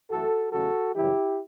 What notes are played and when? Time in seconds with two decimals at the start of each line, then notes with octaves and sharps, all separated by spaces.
0.10 F#2 E3 A3 F#4 A4
0.52 E2 C#3 F#3 A3 F#4 A4
0.94 F#2 C#3 E3 G3 E4 G4